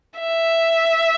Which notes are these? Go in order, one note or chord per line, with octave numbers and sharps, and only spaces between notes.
E5